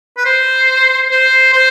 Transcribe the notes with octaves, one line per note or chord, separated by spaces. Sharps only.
B4
C5
C5
C5